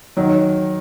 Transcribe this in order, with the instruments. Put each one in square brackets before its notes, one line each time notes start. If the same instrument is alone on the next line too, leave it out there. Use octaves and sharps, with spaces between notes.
[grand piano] D#3 [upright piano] F#3